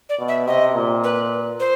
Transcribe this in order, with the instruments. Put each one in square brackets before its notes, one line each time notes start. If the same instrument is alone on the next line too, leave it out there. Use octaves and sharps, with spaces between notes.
[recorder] D5
[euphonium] B2
[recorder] E5
[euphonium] C3 [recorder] D#5
[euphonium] A#2
[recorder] B4
C5